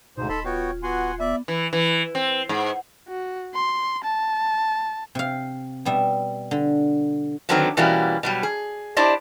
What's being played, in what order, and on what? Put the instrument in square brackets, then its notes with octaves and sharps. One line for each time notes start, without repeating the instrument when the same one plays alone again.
[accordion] D2 G#2 [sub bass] B2 [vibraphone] D#4 [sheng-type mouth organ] C5
[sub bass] D#1 [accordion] A4 [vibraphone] D#5 [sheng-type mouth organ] A5 B5 C6
[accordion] B3 F#4 [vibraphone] F4 [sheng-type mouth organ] C#5 G5
[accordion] B3 F#4 [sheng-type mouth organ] F#5 G#5 C6
[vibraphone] B3 [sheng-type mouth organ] D5 [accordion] E5
[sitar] E3
E3
C4
G#2
[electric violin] F#4
C6
A5
[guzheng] C3 F5
B2 G3 E5
D3
[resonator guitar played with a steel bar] D3 D#3 F#3 B3 C4 D#4
B2 E3 G3 A#3 C#4 F#4
B2 F#3 G3
G#4
D4 E4 G4 C5 D5 D#5